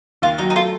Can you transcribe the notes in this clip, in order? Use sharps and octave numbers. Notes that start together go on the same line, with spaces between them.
D#2 F4
F#3 D#4
D#4
A3 F4